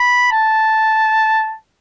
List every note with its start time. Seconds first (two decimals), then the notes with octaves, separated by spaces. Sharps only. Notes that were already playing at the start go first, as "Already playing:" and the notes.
Already playing: B5
0.32 A5